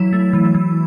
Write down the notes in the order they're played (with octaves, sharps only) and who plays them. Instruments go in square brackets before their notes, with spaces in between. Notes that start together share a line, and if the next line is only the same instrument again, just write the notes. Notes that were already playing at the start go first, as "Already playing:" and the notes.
Already playing: [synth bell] E3 E4 [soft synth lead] F#3
[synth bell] A3
E3
E3